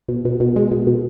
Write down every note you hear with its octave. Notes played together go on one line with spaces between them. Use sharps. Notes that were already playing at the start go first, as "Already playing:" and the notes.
B2
B2
B2
G#3
B2
B2